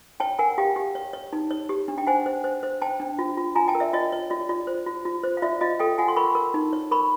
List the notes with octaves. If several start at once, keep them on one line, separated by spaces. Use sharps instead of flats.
C#5 G5 A5
A#4 F#5 G#5
G4 F5 G5
G4
C#5
C#5
D#4
C#5
G4
D4
G5
C5 F#5 G#5
C5
C5
C5
C5 G5 A5
D4
F4
F4
F4 G#5 A#5
G5 A5
A#4
D5 E5
F4 C#5 D#5
C#5
F4 D5
F4 D5
C5
F4
F4
C5
F5
F4 D5 E5
F4 D#5 F5
A4 F5 G5
F4 F#5 G#5
C6
A#4 B5 C#6
A#4
D#4
C#5
A#4 B5 C#6